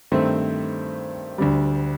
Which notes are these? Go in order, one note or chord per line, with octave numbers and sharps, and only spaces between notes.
G2 D#3 A3 C4 C5
D2 D3 G3